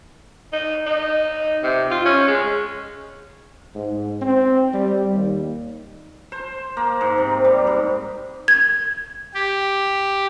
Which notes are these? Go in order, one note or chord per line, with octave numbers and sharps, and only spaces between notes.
D#4
D#4
C3
F4
C#4
G#3
G#2
C4
G3
D#2
C5
A#3
G#2
C3
G3
G#2
G#6
G4